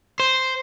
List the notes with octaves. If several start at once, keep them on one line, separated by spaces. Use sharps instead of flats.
C5